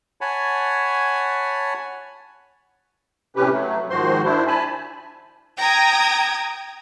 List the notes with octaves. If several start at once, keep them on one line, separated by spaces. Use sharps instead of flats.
C#5 F#5 G#5 A5 B5
A2 C3 C#4 G4 B4
F#3 A3
G#2 D#3 F3 F#4 C5 C6
D4 E4 C5
G#5 A5 B5
G5 A#5 D#6 G#6